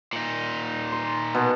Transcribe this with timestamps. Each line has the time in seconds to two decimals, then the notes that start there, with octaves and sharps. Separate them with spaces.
0.13 A#2 D#4
0.92 C6
1.35 B2